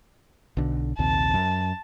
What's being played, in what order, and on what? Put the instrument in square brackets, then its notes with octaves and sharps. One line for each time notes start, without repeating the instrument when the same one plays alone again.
[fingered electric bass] B1 D3
[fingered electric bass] A#1 D#2 C3 [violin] A5
[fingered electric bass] F#2